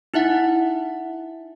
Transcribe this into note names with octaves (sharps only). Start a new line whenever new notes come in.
D#4 E4 E5 F#5